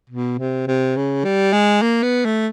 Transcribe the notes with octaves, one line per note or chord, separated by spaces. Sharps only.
B2
C3
C3
C#3
G3
G#3
A#3
B3
A3